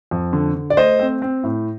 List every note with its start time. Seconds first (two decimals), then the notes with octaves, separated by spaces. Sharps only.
0.11 F2
0.33 D3
0.55 D3
0.70 D5
0.77 A3 C5 D#5
0.99 C4
1.22 C4
1.44 A2